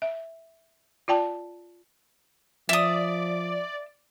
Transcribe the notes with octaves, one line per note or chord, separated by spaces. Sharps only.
E5
F4 D5 G5 A5
F3 D5 E5 D#6